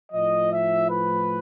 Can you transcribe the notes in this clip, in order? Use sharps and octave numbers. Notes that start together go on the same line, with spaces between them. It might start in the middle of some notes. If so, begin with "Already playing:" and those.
A2 F3 D#5
E5
B4